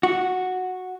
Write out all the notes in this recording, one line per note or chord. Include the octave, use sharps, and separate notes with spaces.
F#4